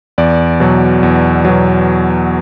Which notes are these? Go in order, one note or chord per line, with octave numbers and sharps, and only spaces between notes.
E2 D5
B2 F#3
E2
B2 F#3